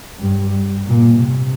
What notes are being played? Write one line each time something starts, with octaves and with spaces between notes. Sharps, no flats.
G2
A#2
C3